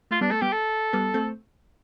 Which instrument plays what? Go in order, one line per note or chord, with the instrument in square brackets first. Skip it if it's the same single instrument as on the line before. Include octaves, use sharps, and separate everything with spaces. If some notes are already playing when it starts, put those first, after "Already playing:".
[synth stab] A3 [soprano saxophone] F4
[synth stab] G3 B3 [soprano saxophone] D4
[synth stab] A3 [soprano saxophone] A4
[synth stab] G3 B3 [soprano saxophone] G4
[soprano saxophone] A4
[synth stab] G3 B3
A3 C4